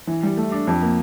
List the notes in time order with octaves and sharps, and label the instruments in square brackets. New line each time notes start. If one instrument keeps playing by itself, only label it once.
[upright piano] E3
G3
A3
D4
F2
A#3